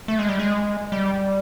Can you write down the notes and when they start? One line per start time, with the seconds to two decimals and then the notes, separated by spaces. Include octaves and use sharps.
0.08 A3
0.19 G#3
0.29 G3
0.39 G#3
0.92 G3